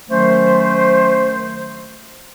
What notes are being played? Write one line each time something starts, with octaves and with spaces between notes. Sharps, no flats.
D#3 F#3 A3 C#4 C5